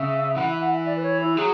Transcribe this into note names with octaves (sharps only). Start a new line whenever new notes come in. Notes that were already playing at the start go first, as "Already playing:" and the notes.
Already playing: C#3 E5
E3 F#5
E5
F#5
E5
D5
B4
C#5
E4
F#3 G#4